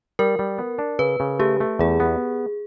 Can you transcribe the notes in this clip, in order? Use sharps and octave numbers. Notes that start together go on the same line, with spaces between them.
G3 A#4
G3
B3
D4
C#3 B4
C#3
A3 G4
A3
E2 G#4
B3